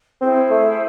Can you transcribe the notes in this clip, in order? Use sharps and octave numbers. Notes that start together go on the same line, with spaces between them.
C4 E4 G#4 C5
A3